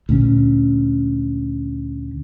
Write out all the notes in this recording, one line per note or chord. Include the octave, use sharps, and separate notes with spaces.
D2 A#2 C#4